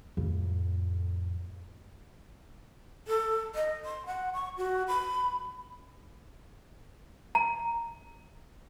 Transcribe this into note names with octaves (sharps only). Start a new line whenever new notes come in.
F2 A2
A4
D#5
C6
F#5
C#6
F#4
B5
A#5